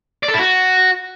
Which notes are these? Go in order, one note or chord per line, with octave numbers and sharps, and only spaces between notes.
D5
A4
E4
F#4